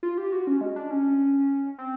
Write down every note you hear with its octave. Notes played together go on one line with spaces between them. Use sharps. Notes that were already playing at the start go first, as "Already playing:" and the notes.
F4
G4
F#4
C#4
G#3
D4
C#4
C4